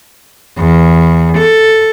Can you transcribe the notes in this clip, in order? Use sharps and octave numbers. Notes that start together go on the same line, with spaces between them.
E2
A4